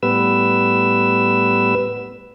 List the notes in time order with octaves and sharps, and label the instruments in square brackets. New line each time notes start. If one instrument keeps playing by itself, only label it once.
[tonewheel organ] A2 G3 B3 B4 E6